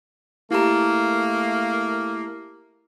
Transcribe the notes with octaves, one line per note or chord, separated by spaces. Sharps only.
A3 A#3 E4 G4 A#5